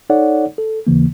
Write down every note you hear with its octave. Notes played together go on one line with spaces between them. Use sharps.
D#4 A4 C#5 D5 F#5
A4
D#2 C#3 E3 A#3